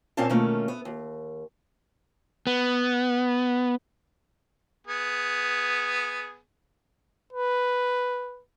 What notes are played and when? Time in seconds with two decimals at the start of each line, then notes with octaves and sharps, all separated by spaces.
0.17 A#2 A#3 C4 C#4 F5 A5
0.29 B2 D#3 A3 A#3 C#4 F4
0.68 B3
0.85 D#2
2.47 B3
4.87 B3 G#4
7.33 B4